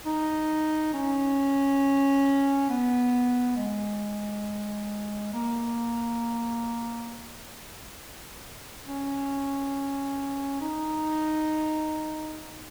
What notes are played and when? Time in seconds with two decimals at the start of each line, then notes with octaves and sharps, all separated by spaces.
0.06 D#4
0.94 C#4
2.69 B3
3.57 G#3
5.33 A#3
8.85 C#4
10.61 D#4